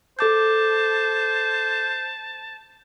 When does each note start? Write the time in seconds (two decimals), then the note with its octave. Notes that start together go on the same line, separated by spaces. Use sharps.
0.19 A4 C5 A5 D6 G6